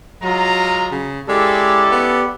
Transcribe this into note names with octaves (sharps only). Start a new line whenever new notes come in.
F#3 G#3 F4 A#5
C#3
G#3 C#4 E4 G4 A4 D5
B3